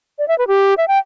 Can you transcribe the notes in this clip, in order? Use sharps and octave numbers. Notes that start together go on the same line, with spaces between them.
D5
E5
B4
G4
E5
G5